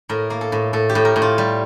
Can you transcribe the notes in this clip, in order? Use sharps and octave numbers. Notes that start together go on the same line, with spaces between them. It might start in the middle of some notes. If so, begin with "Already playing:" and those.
A2 A#4
A#3
A4
A2
A2 A4
G4
A2
A#4
A2
F4
G3